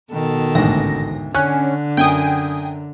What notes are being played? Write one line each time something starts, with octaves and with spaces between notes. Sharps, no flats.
B2 D#3 A4
A1 D2 G#2 A#6
D3 C#4 F#6
F#2 G5 G#5 D#6